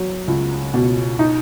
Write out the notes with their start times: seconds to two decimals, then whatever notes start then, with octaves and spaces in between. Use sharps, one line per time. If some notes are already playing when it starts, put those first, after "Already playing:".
Already playing: F#3
0.28 C#2
0.74 B2
1.19 D#4